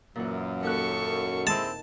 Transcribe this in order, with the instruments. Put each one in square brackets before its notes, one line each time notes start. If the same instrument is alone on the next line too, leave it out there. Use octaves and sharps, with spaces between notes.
[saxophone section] F#2 [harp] A#2 E3 F#5
[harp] D#2 F#6 [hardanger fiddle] A4 C#6
[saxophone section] G#3 C4 E4 [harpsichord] A5